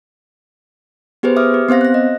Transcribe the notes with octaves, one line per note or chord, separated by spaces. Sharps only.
B3 G4 G#4 B4 C5
E5 D6 D#6 F6
G4
B3 C4 C5 F5 A#6
F#6 A#6
D#5